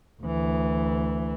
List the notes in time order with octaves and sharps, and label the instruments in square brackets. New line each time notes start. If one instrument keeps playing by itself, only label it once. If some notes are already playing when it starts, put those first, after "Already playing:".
[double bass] D2 E3